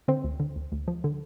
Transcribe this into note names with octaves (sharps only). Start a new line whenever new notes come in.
D3 C4 C5
D2
D3
D2
D2
F3
D3